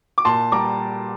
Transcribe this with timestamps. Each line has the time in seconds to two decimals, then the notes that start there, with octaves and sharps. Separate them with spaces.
0.18 D6
0.25 A#2 A5 C6
0.52 G3 A#5 D6